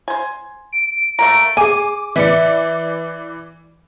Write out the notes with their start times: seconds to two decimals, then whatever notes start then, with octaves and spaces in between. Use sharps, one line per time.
0.08 C5 G#5
0.73 D7
1.19 A3 A#3 A#5
1.57 G#4 G#5 D6
2.16 E3 D5 E5 C#7